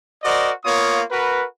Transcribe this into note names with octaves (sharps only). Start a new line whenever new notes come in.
F#4 A#4 C5 D5 D#5
A#3 B3 F4 C#5 D#6
F#4 A#4 B4